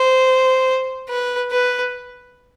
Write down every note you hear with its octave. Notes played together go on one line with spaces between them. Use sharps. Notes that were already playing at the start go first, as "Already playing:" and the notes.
Already playing: C5
B4
B4